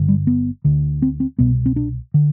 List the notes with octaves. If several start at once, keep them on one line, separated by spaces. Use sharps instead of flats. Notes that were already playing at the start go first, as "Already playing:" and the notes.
Already playing: G1 G2 D3
G3
B3
D2 D3
C4
C4
C2 B2 B3
C4
D4
D3